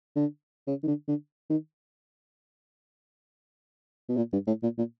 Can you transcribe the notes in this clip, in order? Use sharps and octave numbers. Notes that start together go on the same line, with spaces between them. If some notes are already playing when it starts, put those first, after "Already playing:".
D3
C#3
D#3
D3
D3
D#3
B2
A#2
G2
A2
A#2
A#2